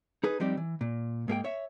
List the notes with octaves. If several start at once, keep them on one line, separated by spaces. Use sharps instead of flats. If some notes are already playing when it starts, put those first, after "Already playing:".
D#4 G#4 B4
F3 G3 C4 D#4 G4 D5
E3
A#2
G#2 A#3 G#4 G5
C#5 E5